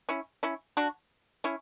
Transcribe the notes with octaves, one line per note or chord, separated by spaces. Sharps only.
C#4 E4
C#4 E4
D4 F#4
C#4 E4